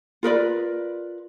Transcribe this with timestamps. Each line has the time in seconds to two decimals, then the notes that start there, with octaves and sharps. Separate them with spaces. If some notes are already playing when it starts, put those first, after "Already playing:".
0.23 F4 A#4 B4 D5